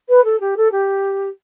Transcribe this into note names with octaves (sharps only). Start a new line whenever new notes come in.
B4
A4
G4
A4
G4